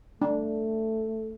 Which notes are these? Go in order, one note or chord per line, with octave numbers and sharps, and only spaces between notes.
A3 D4